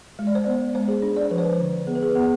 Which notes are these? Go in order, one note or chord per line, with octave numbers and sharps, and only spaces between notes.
G#3
D5
C5
B3 D5
G#3 C5
G#4
D4
D5
C5
F3 B4
C5
D3
B3 G#4
B4
G#4
B3